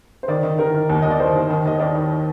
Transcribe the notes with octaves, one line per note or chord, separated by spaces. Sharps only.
C5
D#3 D5
D#3
D#3 A#4
D#3
D#2
D#2 D#5
D5
D#3 C5
D#2
D#3
D#2 D#5
D#3 D5
D#3